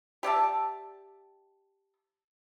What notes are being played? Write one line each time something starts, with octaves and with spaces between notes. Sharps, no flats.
G4 D5 E5 A5